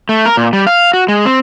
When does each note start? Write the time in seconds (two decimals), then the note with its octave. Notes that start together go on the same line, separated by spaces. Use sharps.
0.09 A3
0.25 A#4
0.37 A#2
0.53 G3
0.67 F5
0.94 F#4
1.08 G#3
1.25 C4